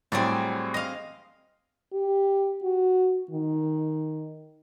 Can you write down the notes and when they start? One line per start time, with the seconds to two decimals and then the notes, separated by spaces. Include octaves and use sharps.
0.12 A2 F#3 G3 C4 G#4 D5
0.74 D#5 F5 A#6
1.93 G4
2.63 F#4
3.30 D#3